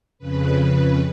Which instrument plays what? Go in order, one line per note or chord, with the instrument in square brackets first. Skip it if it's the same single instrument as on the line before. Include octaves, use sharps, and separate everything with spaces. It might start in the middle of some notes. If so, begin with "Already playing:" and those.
[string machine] F2 C#3 B4